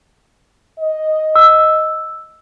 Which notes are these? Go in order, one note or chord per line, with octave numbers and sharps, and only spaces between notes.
D#5
E6